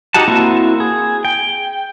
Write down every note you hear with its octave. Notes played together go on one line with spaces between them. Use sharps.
D#4 F#4 G4 F#5 A5
A#3 C4 E4 F#4
G#4
G5